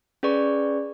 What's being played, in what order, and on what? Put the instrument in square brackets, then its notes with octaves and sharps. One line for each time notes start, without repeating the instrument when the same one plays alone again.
[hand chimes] C#4 G#4 B4 D5 C#6